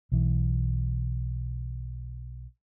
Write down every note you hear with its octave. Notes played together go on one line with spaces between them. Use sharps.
B1 E3